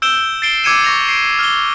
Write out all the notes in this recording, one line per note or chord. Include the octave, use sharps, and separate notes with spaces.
E6 G6 D7 E7 G7
A6 C7 D7 G7
D6 E6 G#6 C#7 D#7 E7
C#6 A#6 F7
C7 D7
F6 G7